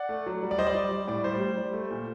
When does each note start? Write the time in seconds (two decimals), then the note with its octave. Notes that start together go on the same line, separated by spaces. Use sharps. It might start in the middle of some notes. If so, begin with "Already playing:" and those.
Already playing: D5 F#5
0.09 A3
0.26 F#3
0.43 G3
0.51 D5
0.59 G3 C5 D#5
0.67 D5
0.75 G3
0.92 G3
1.08 A2 D5
1.24 G3 C5
1.41 G3
1.58 G3
1.73 A3
1.91 A#2